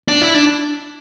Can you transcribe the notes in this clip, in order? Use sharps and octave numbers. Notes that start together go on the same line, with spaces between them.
D4
E4
D4